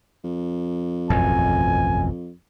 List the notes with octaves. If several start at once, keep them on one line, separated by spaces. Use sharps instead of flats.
F2
E1 A1 F#2 G#5